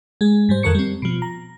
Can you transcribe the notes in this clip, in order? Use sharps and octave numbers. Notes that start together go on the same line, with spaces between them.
G#3 G#4
G#2 G3 C5
F2 D#3 A4 A#4 C#6 C#7
G3 C4
B2 F3
A#5